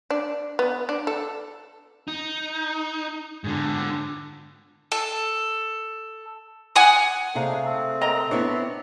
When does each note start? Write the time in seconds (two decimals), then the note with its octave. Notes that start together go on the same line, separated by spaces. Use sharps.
0.10 D4
0.59 B3
0.89 D4
1.07 A4
2.08 D#4
3.44 G#2 D3
4.92 A4
6.76 F#5 G#5 D#6
7.35 C3 A3 D4 D#4 G#4 F5
7.65 C4
8.01 A#4 D#5 A#5
8.31 B3 D4 E4 C#5